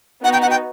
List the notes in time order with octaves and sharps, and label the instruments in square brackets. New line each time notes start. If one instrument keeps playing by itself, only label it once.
[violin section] B3 D#4 F#4 B4 [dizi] F#5
[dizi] G5
F#5
G5